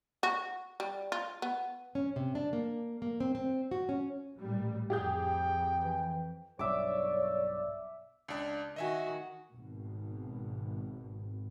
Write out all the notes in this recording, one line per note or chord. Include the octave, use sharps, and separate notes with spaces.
F#4
G3
F4
B3
C#4
C3
D4
A#3
A#3
C4
C4
F#4
C#4
A1 A#2 G3
F2 G4 G#4 G5 G6
E3
B1 G2 C#5 D5 E5 D6
C#2 D4
D#3 F#4 D#5 E5 G#5
G#1 B2